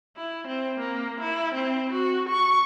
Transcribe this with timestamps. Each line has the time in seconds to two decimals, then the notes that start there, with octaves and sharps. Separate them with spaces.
0.17 E4
0.48 C4
0.80 A#3
1.20 E4
1.55 C4
1.93 F#4
2.30 C#6